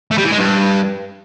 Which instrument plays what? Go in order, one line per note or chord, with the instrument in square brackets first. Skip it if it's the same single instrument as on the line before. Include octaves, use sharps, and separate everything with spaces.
[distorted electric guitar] A3
G3
E3
G#3
G2